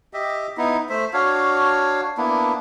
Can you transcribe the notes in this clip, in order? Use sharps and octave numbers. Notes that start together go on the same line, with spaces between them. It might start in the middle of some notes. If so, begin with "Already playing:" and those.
G4 D#5 E5
B3 D#4 E4
A3 C5 E5
D4 F#4 C#5 F5
A#3 B3 D4 E4